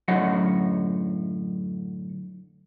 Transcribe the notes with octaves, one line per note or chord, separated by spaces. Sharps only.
F#2 A2 D3 F#3 D#5 F#5